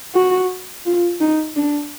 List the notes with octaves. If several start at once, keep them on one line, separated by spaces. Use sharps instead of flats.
F#4
F4
D#4
D4